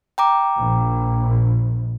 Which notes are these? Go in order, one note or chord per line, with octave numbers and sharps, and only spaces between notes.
G5 A#5 D6
A#1